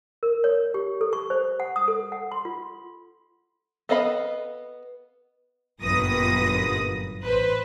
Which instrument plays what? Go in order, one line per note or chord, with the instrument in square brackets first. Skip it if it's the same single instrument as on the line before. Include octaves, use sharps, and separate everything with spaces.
[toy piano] A#4
C#5
G4
A4
C#6
C5
F#5
D#6
A4
F#5
C6
F4
[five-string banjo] B3 A4 D#5 F5 B5
[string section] G1 F#2 A#2 B4 D#6 A#6
A1 B4 C5